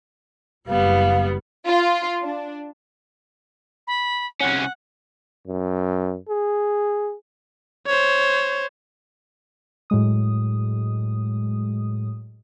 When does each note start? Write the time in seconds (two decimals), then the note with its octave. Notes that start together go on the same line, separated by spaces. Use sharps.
0.68 F#1 G3 B3 F5
1.67 F4
2.22 D4
3.87 B5
4.41 C2 C#4 F#5
5.47 F#2
6.29 G#4
7.87 C5 C#5
9.90 A2 F#3 G#3 D#6